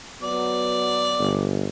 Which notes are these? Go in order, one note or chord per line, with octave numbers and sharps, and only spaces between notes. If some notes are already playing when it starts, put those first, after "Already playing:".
F#3 B3 D5
G1